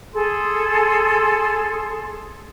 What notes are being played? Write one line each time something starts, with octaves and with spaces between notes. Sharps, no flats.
G#4 A4 C6